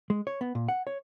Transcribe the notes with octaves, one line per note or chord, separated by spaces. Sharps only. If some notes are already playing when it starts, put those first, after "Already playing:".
G#3
C#5
B3
A#2
F#5
C#5